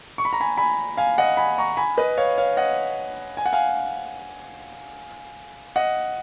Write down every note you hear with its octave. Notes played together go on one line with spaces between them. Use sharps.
C#6
B5
A#5
G#5 B5
G#5 B5
F5 G#5
D#5 F#5
G#5 B5
A#5 C#6
G#5 B5
B4 D#5
C#5 F5
C#5 F5
D#5 F#5
G#5
F#5
F5 G#5
D#5 F#5